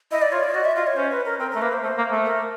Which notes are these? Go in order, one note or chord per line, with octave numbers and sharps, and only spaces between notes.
E4 D#5
D5
F4 C#5
D5
F#4 D#5
E5
F4 D#5
C#5
C#4 C5
B4
A#4
C4 A#4
A#4
A3
A#3 B4
C5
A3 C5
A#3
A3
A#4